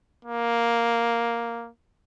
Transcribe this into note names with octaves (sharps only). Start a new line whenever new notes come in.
A#3